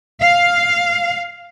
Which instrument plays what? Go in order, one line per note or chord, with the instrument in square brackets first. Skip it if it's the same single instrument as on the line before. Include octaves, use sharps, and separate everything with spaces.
[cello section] F5